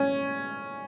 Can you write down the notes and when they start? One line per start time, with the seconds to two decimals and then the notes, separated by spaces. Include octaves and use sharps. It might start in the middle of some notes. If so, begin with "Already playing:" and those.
Already playing: C#4